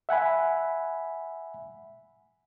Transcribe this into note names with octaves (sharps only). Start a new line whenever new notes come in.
E5 F#5 G#5 B5